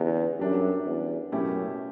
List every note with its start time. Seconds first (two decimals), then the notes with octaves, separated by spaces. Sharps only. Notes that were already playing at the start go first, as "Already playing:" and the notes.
Already playing: E2 D3 G3 C#4
0.39 F#2 G3 D4 G4
0.85 E2
1.32 F#2 B2 A3 C#4 E4 G4